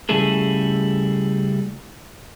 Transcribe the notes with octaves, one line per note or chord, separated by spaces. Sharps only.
C#3 G3 A3 E4 G#4 A4